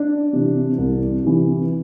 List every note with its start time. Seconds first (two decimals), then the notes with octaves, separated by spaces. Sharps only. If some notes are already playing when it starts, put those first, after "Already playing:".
Already playing: D4
0.33 C3 E3
0.78 C2
1.24 C3 E3